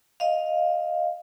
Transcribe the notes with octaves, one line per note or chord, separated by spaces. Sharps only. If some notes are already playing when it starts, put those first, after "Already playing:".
D#5 F5